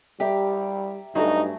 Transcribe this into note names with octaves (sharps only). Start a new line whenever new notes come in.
G3 G4 D5 E5 A#5
G2 F#3 A3 D#4 G#5